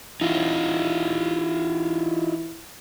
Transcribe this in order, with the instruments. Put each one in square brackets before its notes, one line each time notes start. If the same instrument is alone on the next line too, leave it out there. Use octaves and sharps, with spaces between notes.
[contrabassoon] E3 [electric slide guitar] D#4 F4